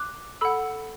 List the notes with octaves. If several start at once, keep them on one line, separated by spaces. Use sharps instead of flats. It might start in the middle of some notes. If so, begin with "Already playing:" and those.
Already playing: D6 F#6
A4 F#5 B5 E6